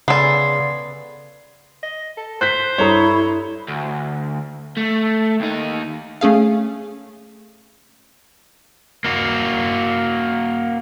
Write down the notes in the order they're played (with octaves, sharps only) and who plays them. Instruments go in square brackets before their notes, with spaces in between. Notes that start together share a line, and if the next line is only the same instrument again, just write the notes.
[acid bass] C#3 [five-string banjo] B3 A4 [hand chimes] D5 C6 C7
[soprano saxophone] D#5
A4
[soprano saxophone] C5 [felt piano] F#6 G6 B6
[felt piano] G2 A4 C#6 [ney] E4 [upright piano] C#5 A#5 D#6
[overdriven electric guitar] D2
A3
D#2 D#4
[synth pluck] A3 C#4 G#4 F5
[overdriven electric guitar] A#3 F#4